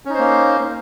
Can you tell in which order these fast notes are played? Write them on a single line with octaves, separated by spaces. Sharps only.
C#4 D#4 C5 A#3